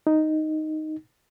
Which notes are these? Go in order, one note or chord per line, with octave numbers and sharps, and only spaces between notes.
D#4